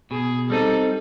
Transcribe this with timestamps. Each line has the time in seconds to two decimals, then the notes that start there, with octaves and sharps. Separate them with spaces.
0.11 B2 G#4
0.50 G3 C4 D#4 A4